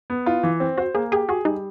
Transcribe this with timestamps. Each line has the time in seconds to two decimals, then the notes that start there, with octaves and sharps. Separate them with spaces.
0.10 B3
0.26 E4 F4
0.43 E3
0.60 C4
0.78 F#4 C5
0.95 A#3 G#4
1.12 G4 G#4
1.29 F#4 G#4
1.45 G3 D#4